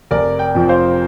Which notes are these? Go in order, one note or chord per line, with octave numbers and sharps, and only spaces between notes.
F1 A#4 D5
D5 G5
F2 F3
C5 F5